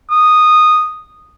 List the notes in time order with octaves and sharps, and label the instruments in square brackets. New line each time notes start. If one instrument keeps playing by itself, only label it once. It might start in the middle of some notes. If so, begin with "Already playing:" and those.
[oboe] D#6